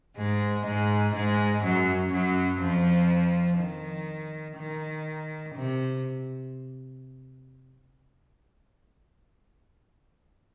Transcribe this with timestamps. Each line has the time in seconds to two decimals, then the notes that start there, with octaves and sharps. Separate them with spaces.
0.17 G#2 G#3
0.66 G#2 G#3
1.15 G#2 G#3
1.64 F#2 F#3
2.12 F#2 F#3
2.61 F2 F3
3.59 D#3
4.58 D#3
5.55 C3